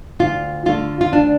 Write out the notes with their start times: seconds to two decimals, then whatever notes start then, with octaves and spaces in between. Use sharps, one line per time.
0.19 D2 F4
0.66 D3 A3 F4
1.01 F4
1.12 D2 D4